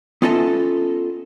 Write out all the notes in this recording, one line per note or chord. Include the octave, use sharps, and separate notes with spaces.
B3 C#4 F4 A4 D#5 E5